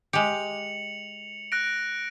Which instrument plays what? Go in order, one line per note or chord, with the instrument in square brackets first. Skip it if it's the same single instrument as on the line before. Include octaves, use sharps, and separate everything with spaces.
[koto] G#3 G4 [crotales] C#7 F7 F#7
[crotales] F#6 A#6 D7